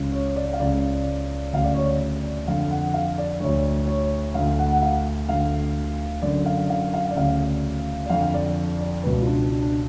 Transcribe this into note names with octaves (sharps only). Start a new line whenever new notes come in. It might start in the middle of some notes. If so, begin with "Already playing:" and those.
Already playing: C#2 C#3
C#5
D5
F5
C#2 C#3 D5
D2 C#3 F5
D5
C#5
D5
F2 D3 F5
F#5
F5
D5
D2 D3 C#5
C#5
D2 D3 F5
F#5
F#5
F5
D2 D3 F5
F#2 D3 D5
F5
F5
F5
D5
D2 C#3 F5
D5
F2 D3 F5
D5
D5
C#2 B2 B4
F4
D4
D4
D4